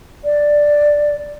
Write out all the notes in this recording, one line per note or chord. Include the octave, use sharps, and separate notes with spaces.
D5